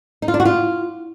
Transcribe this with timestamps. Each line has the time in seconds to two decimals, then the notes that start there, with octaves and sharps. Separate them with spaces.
0.22 D#4
0.28 F4
0.34 D4
0.40 F#4
0.45 F4